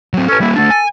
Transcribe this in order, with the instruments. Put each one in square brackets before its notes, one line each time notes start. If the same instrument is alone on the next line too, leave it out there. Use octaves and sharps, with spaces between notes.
[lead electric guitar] F#3 C4
[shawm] C#4 [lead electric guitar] A4 B4
[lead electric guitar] G3 A#3 [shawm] E4
[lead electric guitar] A3 D4 [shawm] A4
[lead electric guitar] G#5